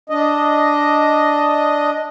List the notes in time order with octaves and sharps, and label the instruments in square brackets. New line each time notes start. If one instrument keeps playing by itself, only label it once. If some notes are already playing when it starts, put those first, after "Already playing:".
[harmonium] D4 D#5